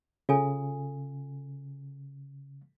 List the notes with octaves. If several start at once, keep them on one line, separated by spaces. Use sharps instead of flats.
C#3 F4 A4 G#5